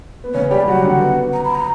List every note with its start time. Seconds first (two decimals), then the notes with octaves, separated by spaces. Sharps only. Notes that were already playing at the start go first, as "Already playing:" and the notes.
0.24 B3
0.34 C#3 C#4 C#5
0.51 G3 G4 D5
0.67 F#3 F#4 F#5
0.84 D3 D4
1.00 B3
1.33 A#5
1.45 B5
1.55 A#5